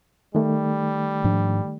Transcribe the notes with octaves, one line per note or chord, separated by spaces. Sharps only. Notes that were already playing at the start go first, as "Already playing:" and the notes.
D#3 G3 A3
G#2 F3 D4